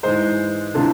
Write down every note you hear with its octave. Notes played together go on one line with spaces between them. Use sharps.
G#2 E3 G#3 C5
C3 E3 A3 D4 F4